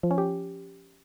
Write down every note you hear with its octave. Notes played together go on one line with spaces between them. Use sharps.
F3
C#4
G4